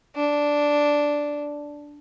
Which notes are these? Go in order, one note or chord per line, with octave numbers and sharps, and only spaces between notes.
D4